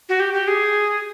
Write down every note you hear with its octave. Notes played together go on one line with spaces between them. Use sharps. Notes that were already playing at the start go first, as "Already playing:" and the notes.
F#4
G4
G4
G#4